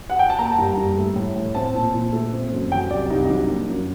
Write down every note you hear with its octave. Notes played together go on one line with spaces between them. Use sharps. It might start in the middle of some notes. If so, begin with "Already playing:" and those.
F#5
G5
A5
A#3 A#5
G2
G2
A3
A2
A2
C4 A5
A#2
A#2
A3
C4
F#2
F#3 G5
C2 D5
C2 D#4
D#4
F#3 D4
A#3
F#2